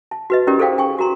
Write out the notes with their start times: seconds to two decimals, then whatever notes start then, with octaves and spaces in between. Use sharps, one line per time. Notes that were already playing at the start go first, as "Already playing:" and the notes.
0.11 A5
0.30 F#4 B4 D#5
0.47 C#4 D#4 E4 G4 A#4 D5
0.59 G#4 A4 C5 D5 F5 G5
0.78 G5 G#5 C#6
0.98 F#4 A#4 A#5 C6